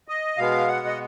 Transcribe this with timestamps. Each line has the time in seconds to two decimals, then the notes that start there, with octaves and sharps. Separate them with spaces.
0.08 D#5
0.37 B2 G#3 B3 F5
0.68 F#5
0.87 D#5